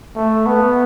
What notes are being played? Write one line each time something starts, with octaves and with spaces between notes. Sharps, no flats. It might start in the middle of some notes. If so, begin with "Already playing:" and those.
A3
B3